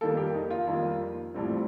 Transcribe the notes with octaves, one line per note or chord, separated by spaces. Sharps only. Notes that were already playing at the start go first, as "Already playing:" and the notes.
F2 D#3 G3 A#3 A4
G4
D#4
F4
F2 D#3 G3 A#3
A#1 A2 G3 C4